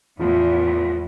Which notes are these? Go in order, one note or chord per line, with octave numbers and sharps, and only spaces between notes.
E2 A2 F3 F4